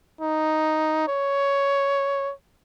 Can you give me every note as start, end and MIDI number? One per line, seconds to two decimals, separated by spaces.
0.21 1.04 63
1.08 2.33 73